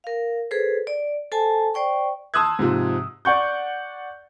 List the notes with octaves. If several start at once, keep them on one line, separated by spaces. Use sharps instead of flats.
A#4 F5
G#4 A4 B4 C5
D5
A4 C5 G#5 A5
C5 D5 G5 C#6
A5 C6 D#6 E6 F#6 G#6
G#2 C3 F3
D5 F#5 C#6 G6